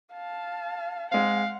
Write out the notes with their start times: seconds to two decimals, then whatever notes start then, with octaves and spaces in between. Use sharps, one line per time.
0.14 F5 A5
1.11 G#3 C4 F5 F#5